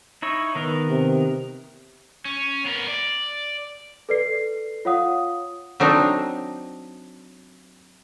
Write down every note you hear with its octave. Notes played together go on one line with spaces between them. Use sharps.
D#4 E4 C#5
D#3 B3 A#4
C3
C#4
B3 A#4
D5
A4 B4 D5 C7
F4 C#5 F5 F#5 D#6
F#3 C4 D4 D#4